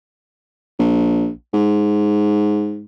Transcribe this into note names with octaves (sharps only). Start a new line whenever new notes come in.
A#1
G#2